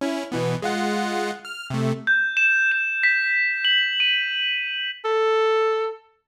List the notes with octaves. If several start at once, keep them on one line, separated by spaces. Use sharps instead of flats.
C#4 E4
B2 E3 B3
G#3 F4 F#5
F6
C3 A3
G6
E7
E7
B6
F#7
D#7
A4